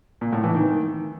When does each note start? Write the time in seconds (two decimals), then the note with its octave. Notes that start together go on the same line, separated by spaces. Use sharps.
0.21 A#2
0.33 A2
0.44 E3
0.55 D#3